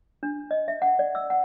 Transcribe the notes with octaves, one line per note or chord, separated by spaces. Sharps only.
D4
D#5
E5
F#5
D5
E6
F#5